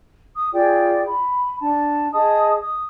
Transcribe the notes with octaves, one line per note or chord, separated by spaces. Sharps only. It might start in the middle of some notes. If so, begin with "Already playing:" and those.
D#6
F4 G#4 D5 G5
B5
D4 A5
G#4 D#5 A5 D#6
D#6